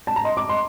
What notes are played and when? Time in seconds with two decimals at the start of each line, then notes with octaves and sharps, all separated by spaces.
0.07 A5
0.16 A#5
0.25 D#5 C6
0.37 D6
0.49 C6